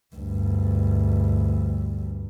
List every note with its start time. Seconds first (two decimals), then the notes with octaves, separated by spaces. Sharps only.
0.16 D2 G2